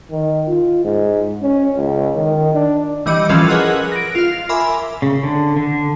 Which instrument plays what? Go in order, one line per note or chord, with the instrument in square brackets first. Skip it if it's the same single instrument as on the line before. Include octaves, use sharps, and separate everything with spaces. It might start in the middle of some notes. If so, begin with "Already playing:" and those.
[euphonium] D#3
F4
G#2
C#4
C#2
D#3
D4
[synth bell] E3 G3 D#5 D6 C#7
E3 F3 C#4 F4 A4 B4
G#4 A#4 B4 D#5 F#5 F#6
A#6 D7
F4 F5
A#4 E5 G#5 B5 C6 D6
[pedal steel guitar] C#3
D3
D3